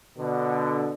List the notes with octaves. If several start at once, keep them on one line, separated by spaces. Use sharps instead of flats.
B2 D3